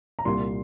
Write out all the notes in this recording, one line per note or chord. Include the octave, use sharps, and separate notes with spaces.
A#5
C2 A#2 G3 C6